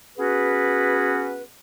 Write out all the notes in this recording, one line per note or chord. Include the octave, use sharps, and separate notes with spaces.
B3 C#4 F#4 G#4 B4